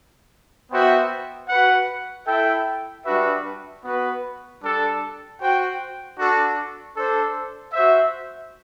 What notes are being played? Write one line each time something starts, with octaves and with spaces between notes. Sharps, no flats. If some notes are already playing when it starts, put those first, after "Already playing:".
B3 F#4 C5 E5 G5
F#4 B4 F#5
E4 A4 E5 G5
G3 D4 F#4 B4 E5
B3 F#4 B4
G3 D4 A4
F#4 C5 G5
D4 F#4 A4
D4 A4 C5
F#4 C5 E5